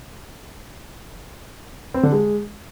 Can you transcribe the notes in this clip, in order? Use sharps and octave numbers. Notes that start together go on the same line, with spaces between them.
C4
D3
G#3